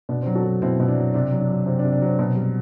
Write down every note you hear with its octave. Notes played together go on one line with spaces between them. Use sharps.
B2 D4
C4
F#3
F#4 A4
F#3
B2 C4 E4
B2 E4
D4
F#3
C3 D4
F#3
D4
F#3
C3 C4
D4
C3
D4
F#3 C4
B2 C4
G3